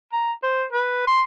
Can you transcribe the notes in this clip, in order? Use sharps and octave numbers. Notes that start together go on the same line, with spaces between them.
A#5
C5
B4
C6